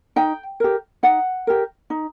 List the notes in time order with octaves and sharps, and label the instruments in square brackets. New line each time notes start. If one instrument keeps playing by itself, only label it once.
[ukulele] D#4 G5
G4 A#4
D#4 F#5
G4 A#4
D#4